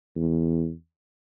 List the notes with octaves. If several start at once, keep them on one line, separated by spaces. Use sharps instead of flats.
E2